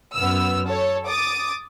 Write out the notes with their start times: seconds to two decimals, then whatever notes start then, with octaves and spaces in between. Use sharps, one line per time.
0.15 F#2 B3 E6 F6
0.68 A4 C#5
1.07 D6 D#6 A6